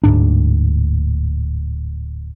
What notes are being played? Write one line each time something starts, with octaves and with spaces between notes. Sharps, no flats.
D1 D2 G#2 D4